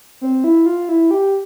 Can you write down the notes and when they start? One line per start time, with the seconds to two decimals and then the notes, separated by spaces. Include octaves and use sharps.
0.21 C4
0.44 E4
0.66 F4
0.89 E4
1.11 G4